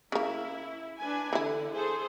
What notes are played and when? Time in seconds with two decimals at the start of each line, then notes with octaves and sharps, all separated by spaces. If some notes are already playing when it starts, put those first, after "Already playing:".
0.12 C#3 A#3 E4
0.98 D4 B4 G#5
1.33 D3 E3 E4
1.72 G#4 A4 C5